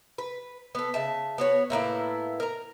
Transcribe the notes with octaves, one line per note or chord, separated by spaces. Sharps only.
B4
B3 A4
C#3 E5 A5
B3 F#4 C#5
A2 A#3 B3 E4
A#4 A#5